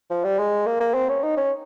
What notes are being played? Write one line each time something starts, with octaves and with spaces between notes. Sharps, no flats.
F3
G3
G#3
A#3
A#3
C4
C#4
D#4
C#4